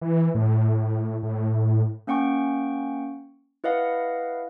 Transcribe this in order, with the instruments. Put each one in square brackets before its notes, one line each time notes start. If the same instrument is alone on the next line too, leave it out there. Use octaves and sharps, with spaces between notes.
[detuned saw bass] E3
A2
A2
[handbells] A#3 C#4 F#5 G5 C#6
E4 B4 D#5 F5 F#5